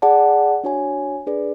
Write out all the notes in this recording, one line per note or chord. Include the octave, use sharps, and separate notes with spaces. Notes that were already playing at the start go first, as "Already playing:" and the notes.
G#4 D5 F#5 A5
D4 F#4 C#5 G#5
D4 G#4 B4 D5